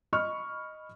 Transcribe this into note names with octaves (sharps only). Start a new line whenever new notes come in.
D#5 B5 C#6 F6